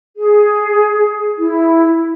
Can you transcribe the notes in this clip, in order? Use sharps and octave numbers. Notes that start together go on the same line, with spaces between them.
G#4
E4